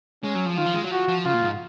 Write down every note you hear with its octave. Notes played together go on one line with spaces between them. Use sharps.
G#3 C#4
F#3
F3
D#3 F4
F3
G#3
F#3
F3 F#4
F3
C#3 F4
A#2
G#2